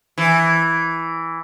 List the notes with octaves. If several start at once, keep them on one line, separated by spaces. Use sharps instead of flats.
E3